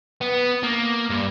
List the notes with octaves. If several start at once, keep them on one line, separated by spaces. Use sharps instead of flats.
B3
A#3
G2